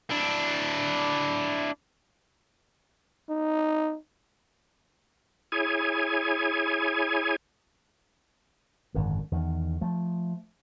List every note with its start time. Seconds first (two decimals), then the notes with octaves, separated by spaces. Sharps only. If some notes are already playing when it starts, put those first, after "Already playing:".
0.10 D4 E4
3.29 D#4
5.52 E4 G#4 C#5 G#5
8.95 G#1 F#2 D3 D#3
9.32 E2 D#3
9.81 F3 A3